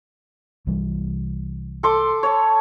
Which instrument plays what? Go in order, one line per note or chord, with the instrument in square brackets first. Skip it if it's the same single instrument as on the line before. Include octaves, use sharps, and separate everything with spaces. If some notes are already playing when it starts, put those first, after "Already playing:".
[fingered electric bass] C2 E3 G3
[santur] A4 C6 D6
C#5 A5